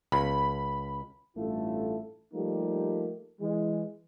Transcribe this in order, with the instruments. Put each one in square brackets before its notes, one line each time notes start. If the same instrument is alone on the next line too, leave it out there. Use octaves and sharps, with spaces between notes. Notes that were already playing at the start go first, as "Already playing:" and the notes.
[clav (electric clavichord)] C#2 [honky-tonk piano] B5
[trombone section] A1 G2 A3 E4 F4 A4
F3 G3 A3 A#3 D#4 G4
E3 G#3